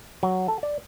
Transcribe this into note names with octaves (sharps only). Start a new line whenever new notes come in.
F#3
A4
D5